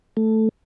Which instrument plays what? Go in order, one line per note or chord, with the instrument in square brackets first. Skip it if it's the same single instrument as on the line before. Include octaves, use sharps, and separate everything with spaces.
[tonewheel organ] A3